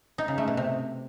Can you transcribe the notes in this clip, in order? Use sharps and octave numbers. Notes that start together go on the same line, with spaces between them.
D#4
C#3
A3
B2
C3